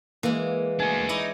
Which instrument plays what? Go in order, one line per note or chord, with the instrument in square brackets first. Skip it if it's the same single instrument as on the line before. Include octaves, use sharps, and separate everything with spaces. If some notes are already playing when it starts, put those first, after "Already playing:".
[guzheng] E3 G#3 [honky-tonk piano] A#3
[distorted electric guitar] D4 F#4 [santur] G#5
[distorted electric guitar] D#4 [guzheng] E4 D5 [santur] C#6